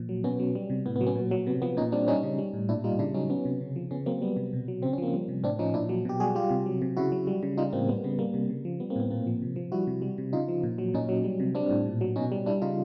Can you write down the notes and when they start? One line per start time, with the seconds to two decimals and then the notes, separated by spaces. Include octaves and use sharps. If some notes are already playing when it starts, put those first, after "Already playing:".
Already playing: A#2 F3
0.09 F#3
0.24 B2 B3 C#4
0.39 F#3
0.55 G3
0.70 C3
0.86 A2 B3
0.96 B3
1.01 F#3
1.06 B3 C#4
1.15 A#2
1.31 F#3
1.46 C3 B3
1.62 F3 B3
1.77 A#2 C#4 D#4
1.92 G3 C4 D4
2.08 G3 C#4 D#4
2.23 C#3
2.38 G3
2.53 A2
2.69 A#2 D4 E4
2.84 G3 D#4 F4
2.99 C#3 D4 E4
3.14 F#3 C#4 D#4
3.30 F#3 B3 C#4
3.45 C3
3.61 C#3
3.76 F3
3.91 C#3 B3 C#4
4.06 F#3 A#3 C4
4.22 G3 B3
4.37 C3
4.53 B2
4.68 F#3
4.82 C#3 C4
4.93 C#4
4.98 F3 A#3 C4
5.14 G3
5.28 C3
5.43 A2 C4 D4
5.59 F3 C#4 D#4
5.74 A#2 D4 E4
5.89 F#3
6.05 B2 G4
6.20 G3 F#4 G#4
6.35 G3 F4 G4
6.50 C3
6.66 F#3
6.82 C3
6.97 C#3 E4 F#4
7.12 F#3
7.27 G3
7.43 C#3
7.57 G3 D#4 F4
7.73 A2 A#3 C4
7.88 G3 B3
8.04 C#3 B3
8.19 G3 A#3
8.34 C3
8.50 C#3
8.65 F3
8.80 G3 B3
8.90 A#3 C4
8.96 A2 B3
9.10 A#2 A#3 C4
9.27 F3
9.42 C3
9.56 F3
9.72 G3 E4 F#4
9.87 C3
10.02 G3
10.18 C3
10.33 C#3 D#4 F4
10.48 F3
10.63 A#2
10.78 F#3
10.94 A#2 C#4 D#4
11.09 F#3
11.24 G3
11.40 C3
11.55 G3 C4 D4
11.71 A2
11.86 A#2
12.01 F#3
12.16 B2 C#4 D#4
12.32 G3
12.46 G3 D4 E4
12.62 C#3 D#4 F4